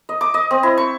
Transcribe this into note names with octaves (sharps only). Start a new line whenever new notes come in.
D#5
D6
D#5
C4
E4
C#6